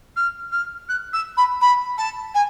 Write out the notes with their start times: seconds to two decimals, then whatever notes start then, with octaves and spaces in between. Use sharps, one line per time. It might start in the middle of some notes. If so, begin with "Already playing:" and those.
0.16 F6
0.52 F6
0.89 F#6
1.13 E6
1.37 B5
1.61 B5
1.98 A5
2.34 G#5